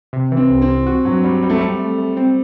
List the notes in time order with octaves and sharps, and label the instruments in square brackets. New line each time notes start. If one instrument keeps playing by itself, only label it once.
[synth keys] C3
E3
[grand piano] C4
[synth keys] C2
[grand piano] C4
[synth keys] C2
F#4
[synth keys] G2 [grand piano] F#3
[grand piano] G3 [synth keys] F#4
[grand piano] G3 [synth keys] F#4
[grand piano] A3
[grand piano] G3 [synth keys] C4
[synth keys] A3
A3
C4